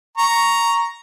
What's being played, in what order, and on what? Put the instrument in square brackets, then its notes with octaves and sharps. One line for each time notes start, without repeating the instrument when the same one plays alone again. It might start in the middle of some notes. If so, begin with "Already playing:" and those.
[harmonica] A#5 C#6